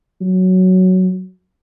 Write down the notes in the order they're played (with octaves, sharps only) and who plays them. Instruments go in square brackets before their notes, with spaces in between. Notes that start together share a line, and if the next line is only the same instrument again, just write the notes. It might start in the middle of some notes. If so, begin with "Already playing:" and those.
[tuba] F#3